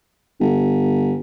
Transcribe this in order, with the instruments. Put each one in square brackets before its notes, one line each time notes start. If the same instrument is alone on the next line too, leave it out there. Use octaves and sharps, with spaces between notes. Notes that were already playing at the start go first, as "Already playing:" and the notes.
[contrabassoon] G1